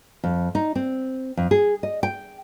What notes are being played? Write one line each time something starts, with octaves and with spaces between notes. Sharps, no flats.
F2
D#4
C4
F2
G#4
D#5
G5